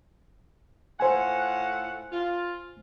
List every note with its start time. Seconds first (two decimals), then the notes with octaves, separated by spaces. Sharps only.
1.00 A2 F4 C5 F#5 G#5
2.12 F4